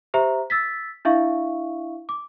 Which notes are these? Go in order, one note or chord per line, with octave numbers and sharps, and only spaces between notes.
G4 C5 E5 A#5
E6 A6 B6
D4 E4 E5 F5 C#6
D6